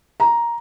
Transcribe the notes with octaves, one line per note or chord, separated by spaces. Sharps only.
A#5